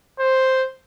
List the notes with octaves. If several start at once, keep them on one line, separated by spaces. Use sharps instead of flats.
C5